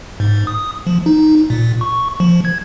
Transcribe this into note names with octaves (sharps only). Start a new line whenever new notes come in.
G#2
D#6
F3
D#4
A#2
C#6
F3
G#6